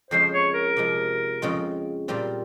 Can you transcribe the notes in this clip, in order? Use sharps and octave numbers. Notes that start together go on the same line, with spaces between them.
F2 C#3 G#3 C5
C#5
A#4
C3 F3 G#3
F2 C#3 G#3 C4 F4
A#2 G3 C4 F4